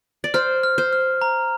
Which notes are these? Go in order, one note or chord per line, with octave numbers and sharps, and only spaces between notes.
D5
C5 F6
F6
C5
F6
A#5